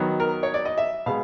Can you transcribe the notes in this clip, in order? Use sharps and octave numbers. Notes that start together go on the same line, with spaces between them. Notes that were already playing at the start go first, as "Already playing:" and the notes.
Already playing: D#3 F#3 B3
A#4
C#5
D5
D#5
E5
B2 G#3 F5